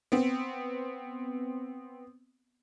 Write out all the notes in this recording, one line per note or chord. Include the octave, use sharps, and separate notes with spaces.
B3 C4